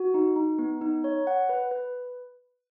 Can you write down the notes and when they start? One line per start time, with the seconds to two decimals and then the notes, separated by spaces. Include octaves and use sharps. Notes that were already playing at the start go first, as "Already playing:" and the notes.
Already playing: F#4
0.14 D#4
0.36 D#4
0.59 B3
0.81 D#4
1.04 C#5
1.27 F#5
1.49 B4
1.71 B4